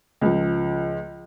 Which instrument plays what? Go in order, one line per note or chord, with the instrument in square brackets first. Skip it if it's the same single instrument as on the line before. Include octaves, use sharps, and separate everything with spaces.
[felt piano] C#2 F3